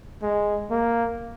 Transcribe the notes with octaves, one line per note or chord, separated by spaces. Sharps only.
G#3
A#3